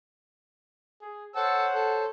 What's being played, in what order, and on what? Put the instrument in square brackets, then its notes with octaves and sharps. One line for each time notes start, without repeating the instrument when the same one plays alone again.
[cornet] G#4
[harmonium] C5 C#5 [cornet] F#5 [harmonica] A5 E6
[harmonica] A4